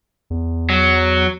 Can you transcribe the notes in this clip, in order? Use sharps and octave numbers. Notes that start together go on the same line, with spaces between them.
E2
F#3